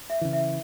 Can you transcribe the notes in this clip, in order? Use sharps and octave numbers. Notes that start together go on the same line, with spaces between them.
E5
C#3 E3
E5